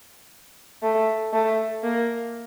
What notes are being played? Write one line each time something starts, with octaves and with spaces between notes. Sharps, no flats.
A3
A3
A#3